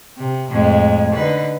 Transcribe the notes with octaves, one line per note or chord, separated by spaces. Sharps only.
C3
F2 A2 G#3
D3 D#4 B4